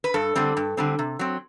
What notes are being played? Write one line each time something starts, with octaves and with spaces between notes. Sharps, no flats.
B4
G2 A4
D3 G3 C4
G2
D3 G3 C4
C3
F#3 C4